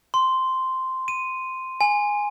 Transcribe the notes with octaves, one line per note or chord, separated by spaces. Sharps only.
C6
D#7
G#5